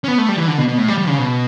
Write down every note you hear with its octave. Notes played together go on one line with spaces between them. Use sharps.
C#4
B3
A3
G3
E3
D3
B2
B2
A2
G3
G3
C#3
B2